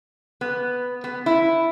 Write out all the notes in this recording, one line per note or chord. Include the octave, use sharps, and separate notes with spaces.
B3
B3
E4